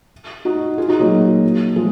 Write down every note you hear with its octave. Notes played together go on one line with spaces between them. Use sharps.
D#4 F#4
F4 G#4
D#4 F#4
F#3 A#3
F3 G#3